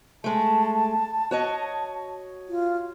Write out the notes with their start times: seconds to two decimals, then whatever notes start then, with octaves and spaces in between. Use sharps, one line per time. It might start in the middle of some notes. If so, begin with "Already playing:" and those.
0.24 G#3 A3 A5
1.31 F#4 C#5 D#5
2.49 F4